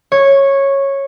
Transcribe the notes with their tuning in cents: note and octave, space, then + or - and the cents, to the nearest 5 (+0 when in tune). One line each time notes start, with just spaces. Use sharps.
C#5 -10